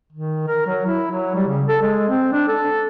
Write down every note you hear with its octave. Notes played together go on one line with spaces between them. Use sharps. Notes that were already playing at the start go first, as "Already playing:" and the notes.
D#3
A#4
F#3
E4
F#3
G3
C#3
A4
G#3
C4
D4
A4